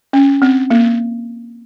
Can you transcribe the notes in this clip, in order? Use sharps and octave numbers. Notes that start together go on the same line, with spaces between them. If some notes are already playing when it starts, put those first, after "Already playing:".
C#4
C4
A#3